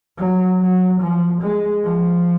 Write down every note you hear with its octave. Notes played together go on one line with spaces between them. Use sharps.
F#3
F#3
F3
G#3
F3